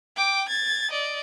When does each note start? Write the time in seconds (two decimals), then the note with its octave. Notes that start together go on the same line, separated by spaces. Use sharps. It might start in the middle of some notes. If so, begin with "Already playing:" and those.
0.16 G5 D6
0.48 G#6 A6
0.91 D5 D#5